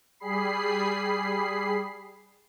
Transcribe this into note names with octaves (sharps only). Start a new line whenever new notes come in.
G3 G#4 B5 C7